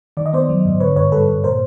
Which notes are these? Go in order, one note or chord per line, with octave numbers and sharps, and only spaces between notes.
D#3 D5
D#5
B3 C5 D5
F#3
G#2
D3 B4 C#5
G2 B4 C#5
G3 A4 B4
G2
A#2 A#4 C5